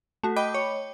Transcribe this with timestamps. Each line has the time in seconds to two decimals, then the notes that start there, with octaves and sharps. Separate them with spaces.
0.23 A3 F#4
0.36 D#5 G5 B5 D6 G6
0.54 C#5